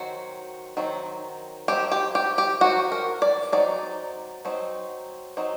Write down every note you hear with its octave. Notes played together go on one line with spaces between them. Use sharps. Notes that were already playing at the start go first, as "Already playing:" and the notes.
Already playing: D#3 F#3 C4 F#4
D#3 F#3 C4
D#3 F#3 C4 G4
G4
G4
G4
D#3 F#3 C4 F#4
A#4
D5
F#3 C4 D#4 D5
F#3 C4 D#4
F#3 C4 D#4